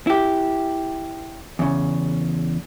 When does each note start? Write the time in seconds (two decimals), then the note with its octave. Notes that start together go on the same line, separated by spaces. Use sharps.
0.07 E4 G4
1.59 E2 C#3